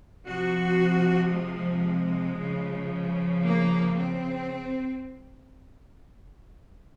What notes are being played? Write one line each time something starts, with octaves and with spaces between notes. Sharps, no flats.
C3 F3 F#4
G#3
C#3 F3
A#3
C4